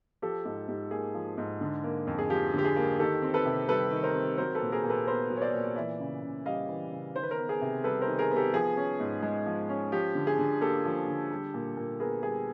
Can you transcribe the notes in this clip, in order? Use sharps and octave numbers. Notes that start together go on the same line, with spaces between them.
F3 G4 A4
G#2 G4
G#2 G4
A#3 G#4
F3
G#2
D3
A#3
F2
G#4
F3 G4
D3
G4
G#4
A#3
D#3 G4 A4
C4
A4 B4
C3
G3 A4 B4
D#3
A#4 C5
C4
F#3 A#4 C5
A4 B4
A#2
G#4 A#4
A#2
A4 B4
B3 A#4 C5
F#3
C#5
C5 D5
A#2
E3 D5 E5
C#3
C#3
G3 D#5 F5
E3
C#3
D#3 C5
B4
A#4 C5
B3
G#4
C3
G3 A4 B4
A#4 C5
D#3
G#4 A#4
B3
G4 A4
F3 G#4
C#4
G#2
G#3
F3
C#4
F3 G4
D3
G#4
D3
A#3 G4 A4
F3
D3
G3
A#2
A#2
B3 G#4 A#4
G3 G#4